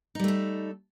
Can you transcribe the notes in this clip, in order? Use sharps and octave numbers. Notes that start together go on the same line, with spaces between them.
G3 A3 D#4 A4